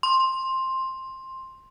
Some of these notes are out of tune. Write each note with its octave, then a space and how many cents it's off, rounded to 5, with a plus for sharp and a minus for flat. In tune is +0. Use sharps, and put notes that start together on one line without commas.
C6 +10